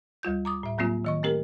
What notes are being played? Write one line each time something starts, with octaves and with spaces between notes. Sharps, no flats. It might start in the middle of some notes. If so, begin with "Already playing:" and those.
D2 G3 F4 G6
A#5 D6 D#6
A2 E5
A2 F#3 A#3 C4 F4
D#3 D#5 C#6
A3 C4 G4 A#4